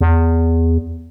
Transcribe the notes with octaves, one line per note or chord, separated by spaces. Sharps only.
E2